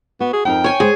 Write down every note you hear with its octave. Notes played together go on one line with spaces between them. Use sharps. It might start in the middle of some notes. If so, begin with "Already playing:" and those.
B3 F#4
G#4
F2 D#4 A#4 G5
C#5 G#5
G#3 G#4 C5 G#5